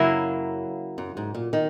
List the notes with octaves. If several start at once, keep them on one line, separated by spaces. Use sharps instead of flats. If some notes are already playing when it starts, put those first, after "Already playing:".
Already playing: F#2 C#3 F#3 A#3 E4
F#2
G#2
A#2
D#3